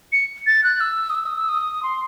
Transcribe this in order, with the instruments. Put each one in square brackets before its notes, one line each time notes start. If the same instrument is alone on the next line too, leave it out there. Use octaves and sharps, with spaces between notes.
[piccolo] C#7
A6
F#6
E6
D#6
E6
D#6
E6
D#6
C6